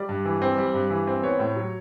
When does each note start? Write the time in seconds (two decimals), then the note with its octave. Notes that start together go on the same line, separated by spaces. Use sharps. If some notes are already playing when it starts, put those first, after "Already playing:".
Already playing: G3 D5
0.09 G2
0.25 E3
0.42 C4
0.58 G3
0.74 G2
0.90 E3
1.07 C4
1.23 B3 C#5
1.39 A2
1.56 F#3